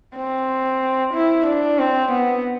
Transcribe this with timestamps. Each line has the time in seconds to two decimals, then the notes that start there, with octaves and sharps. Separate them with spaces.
0.16 C4
1.14 E4
1.47 D4
1.79 C4
2.12 B3